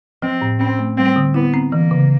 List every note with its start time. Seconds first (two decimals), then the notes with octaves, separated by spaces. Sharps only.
0.22 F3 C4
0.42 A2
0.60 C4 C#4
0.79 A3
0.97 G3 C4
1.16 D3
1.34 B3 E4
1.54 C4
1.72 E3 A#3
1.91 C#3